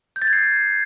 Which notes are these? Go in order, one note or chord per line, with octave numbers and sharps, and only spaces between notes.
G6
A6
G#6
C7